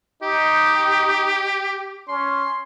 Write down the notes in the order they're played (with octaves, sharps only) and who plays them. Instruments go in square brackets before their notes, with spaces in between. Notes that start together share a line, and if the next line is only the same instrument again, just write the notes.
[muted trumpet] D#4 [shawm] G4
[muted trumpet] C#4 [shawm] C6